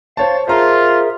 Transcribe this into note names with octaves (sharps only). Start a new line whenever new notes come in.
C5 C#5 F5 A5 A6
F4 G#4 A#4 C5 E5 A#5